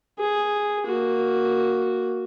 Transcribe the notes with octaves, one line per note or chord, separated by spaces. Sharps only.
G#4
A#3 F#4